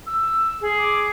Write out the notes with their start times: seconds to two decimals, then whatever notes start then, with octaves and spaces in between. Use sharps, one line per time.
0.07 E6
0.61 G#4
0.78 D6